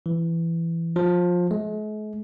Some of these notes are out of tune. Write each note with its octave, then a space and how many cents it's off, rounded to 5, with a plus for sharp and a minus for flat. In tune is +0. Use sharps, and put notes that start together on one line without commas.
E3 +15
F3 +20
G#3 +45